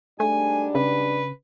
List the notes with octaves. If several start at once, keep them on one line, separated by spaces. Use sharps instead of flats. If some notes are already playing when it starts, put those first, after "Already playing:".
G#2 G3 A3 D4 G#5
C#3 B4